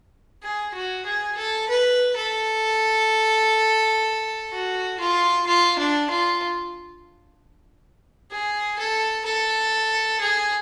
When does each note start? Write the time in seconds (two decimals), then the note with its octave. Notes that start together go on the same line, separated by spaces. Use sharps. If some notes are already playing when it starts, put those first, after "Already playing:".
0.43 G#4
0.74 F#4
1.06 G#4
1.37 A4
1.69 B4
2.16 A4
4.53 F#4
5.00 F4
5.47 F4
5.79 D4
6.10 F4
8.31 G#4
8.79 A4
9.25 A4
10.21 G#4